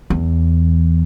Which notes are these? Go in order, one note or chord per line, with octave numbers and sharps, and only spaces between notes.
E2